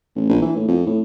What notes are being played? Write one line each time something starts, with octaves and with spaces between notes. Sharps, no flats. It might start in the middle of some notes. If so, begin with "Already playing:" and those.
A1
A#1
E3
A2
F2
A2